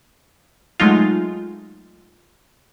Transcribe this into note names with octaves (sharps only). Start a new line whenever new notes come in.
F#3 G#3 A3 D#4 F4